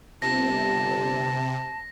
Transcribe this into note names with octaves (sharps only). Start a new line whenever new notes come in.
G1 C3 A5 A#6